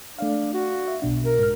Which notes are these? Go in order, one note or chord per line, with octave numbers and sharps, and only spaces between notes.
A3 D4 D5 F5
F#4
E5
B1 B2 D4
A#4
G#2 F6